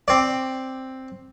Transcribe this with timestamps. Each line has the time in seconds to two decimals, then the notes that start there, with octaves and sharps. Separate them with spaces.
0.08 C4 D5